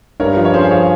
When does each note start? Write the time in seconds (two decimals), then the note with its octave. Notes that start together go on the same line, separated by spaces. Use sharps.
0.20 G2 A#4 C#5
0.37 F3
0.45 C#5
0.54 C#4 G#4 C5
0.71 F3 C#5 F5